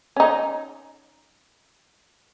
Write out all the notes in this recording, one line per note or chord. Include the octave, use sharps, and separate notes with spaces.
C#4 D#4